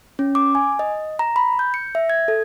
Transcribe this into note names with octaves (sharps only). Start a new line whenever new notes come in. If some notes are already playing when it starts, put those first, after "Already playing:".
C#4
D6
G#5
D#5
A#5
B5
G6
C#7
E5
G#6
A4